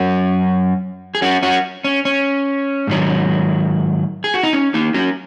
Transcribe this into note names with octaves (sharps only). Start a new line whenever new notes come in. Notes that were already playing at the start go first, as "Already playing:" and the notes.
Already playing: F#2 F#3 C#4 F#4
G#4
C#4 F#4
C#4 F#4
C#4
C#4
G#2 D#3 F#3
G#4
F#4
D#4
C#4
A#3 D#4
C#4 F#4